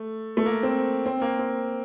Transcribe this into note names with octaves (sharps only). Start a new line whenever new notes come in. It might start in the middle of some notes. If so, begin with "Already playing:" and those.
Already playing: A3
A3
A#3
C4
C4
A#3
C4